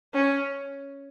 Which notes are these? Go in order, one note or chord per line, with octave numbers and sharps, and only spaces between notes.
C#4